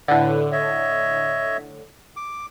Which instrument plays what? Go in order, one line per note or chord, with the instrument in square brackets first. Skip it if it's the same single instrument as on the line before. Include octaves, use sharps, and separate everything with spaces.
[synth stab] A2 D3 [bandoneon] B4
[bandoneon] C#5 D#5 E5
D6